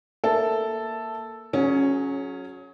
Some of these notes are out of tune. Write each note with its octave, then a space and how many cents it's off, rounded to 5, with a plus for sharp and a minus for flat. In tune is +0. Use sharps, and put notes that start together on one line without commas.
A#3 +0 A4 +0 E5 +0
F#3 -20 C#4 -5 G#4 +30